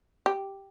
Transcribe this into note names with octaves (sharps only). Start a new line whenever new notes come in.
G4